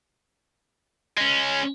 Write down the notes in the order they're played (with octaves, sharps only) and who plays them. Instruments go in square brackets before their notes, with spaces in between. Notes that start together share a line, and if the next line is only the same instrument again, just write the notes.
[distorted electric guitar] G#3 C#4